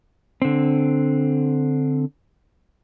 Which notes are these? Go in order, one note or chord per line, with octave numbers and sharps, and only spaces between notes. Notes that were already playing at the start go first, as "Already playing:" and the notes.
D3 C4